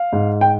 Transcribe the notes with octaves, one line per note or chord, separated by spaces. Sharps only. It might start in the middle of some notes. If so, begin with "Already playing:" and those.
Already playing: F5
G#2
G5